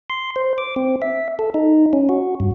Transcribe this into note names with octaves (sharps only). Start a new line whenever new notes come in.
C6
C5
D6
C4
E5
A4
D#4
C#4
F#4
G2